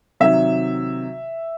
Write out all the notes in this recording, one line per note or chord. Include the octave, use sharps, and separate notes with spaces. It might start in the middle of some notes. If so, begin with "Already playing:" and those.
C3 D#3 F#3 E5